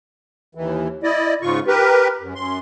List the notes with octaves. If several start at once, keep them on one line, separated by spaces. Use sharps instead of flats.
D#2 E3
E4 D5 D#5
G#2 C#3 F4 C#6
G4 A#4 B4
F#2
F#2 C6